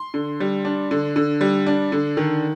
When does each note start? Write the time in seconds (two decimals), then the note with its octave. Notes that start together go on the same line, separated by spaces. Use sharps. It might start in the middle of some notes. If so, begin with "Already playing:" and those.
Already playing: C6
0.14 D3
0.40 G3
0.65 D4
0.91 D3
1.16 D3
1.41 G3
1.67 D4
1.92 D3
2.17 D#3